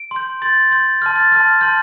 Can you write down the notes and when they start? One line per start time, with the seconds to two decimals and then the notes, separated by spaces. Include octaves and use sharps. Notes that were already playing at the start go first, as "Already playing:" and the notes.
Already playing: D7
0.11 C6
0.16 G6
0.42 C6 G6 A6
0.71 C6 G6
1.02 A5 C6 F6
1.16 A6
1.32 A5 C6 F6
1.61 A5 C6 F6 G6